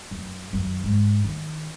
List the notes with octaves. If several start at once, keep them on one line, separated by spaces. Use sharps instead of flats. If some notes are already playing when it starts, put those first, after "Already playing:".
F#2
F#2 D#3
G#2
D#3